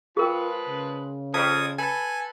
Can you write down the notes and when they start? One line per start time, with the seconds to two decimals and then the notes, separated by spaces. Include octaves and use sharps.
0.17 F3 G#3 F4 G#4 A#4 B4 G5
0.69 C#3
1.34 F2 A5 D#6 G#6
1.78 A4 B4 G#5